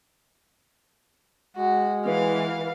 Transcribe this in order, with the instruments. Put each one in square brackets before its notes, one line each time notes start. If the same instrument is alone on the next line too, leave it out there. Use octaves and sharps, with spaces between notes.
[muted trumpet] G#3 [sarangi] F#4
[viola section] E3 [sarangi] F5